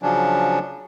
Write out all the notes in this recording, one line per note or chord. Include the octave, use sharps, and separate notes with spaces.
C#3 F3 F#3 C#4 D4